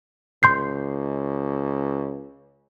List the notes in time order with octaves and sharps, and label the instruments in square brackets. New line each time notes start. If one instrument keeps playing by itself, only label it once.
[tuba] C#2 [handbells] C6 G6 C7